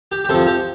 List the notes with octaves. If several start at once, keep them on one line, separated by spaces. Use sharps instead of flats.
G4
G4
C3 F3 A4
G4